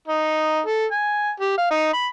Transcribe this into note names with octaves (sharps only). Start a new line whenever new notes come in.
D#4
A4
G#5
G4
F5
D#4
B5